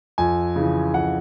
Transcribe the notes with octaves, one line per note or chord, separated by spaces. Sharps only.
F2 G#5
C#3 E3
F2 F#5